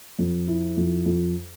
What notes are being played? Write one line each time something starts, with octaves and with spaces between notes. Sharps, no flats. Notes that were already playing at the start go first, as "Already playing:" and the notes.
F2
E4
F2
F2